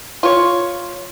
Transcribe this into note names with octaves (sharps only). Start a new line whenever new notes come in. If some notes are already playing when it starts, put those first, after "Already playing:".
F4 C#5